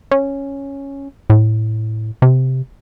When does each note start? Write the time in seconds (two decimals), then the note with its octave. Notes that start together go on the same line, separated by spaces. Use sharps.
0.11 C#4
1.30 A2
2.22 C3